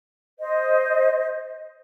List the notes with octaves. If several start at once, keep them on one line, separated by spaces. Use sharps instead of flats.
C5 D#5